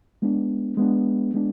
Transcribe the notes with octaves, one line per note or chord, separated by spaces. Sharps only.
G#3 B3 D4
G#3 B3 D4
G#3 B3 D4